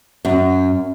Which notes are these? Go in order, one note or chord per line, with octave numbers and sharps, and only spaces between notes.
F#2